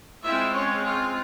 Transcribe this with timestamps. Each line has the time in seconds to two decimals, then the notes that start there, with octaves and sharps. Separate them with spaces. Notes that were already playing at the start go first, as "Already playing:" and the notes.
0.24 G#3 C4 E4 F4 E5
0.54 C#4 C#5
0.84 F4